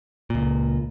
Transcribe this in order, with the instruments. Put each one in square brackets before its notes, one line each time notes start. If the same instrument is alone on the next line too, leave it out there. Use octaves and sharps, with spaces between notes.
[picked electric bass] C#2 A#2